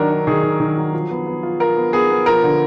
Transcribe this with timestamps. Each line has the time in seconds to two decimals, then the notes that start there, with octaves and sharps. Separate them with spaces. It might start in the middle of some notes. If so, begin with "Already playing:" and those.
Already playing: D#3 F#3 D4 A#4
0.10 D4
0.27 D#3 G#4
0.43 D#3
0.60 D#3
0.77 F#3
0.93 F3
1.11 B3
1.27 B3
1.43 F4
1.60 F4 A#4
1.77 B3
1.93 B3 G#4
2.10 B3
2.26 F3 A#4
2.43 D3